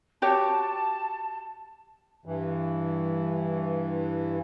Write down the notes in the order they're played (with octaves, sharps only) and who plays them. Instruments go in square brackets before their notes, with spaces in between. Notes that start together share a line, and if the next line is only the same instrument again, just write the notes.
[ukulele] F#4 G4 C#5 [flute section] A5
[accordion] G2 E3